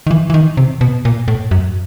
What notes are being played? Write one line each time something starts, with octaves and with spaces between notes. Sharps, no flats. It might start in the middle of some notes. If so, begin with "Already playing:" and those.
D#3
E3
E3
D#3
C3
B2
A#2
A2
F#2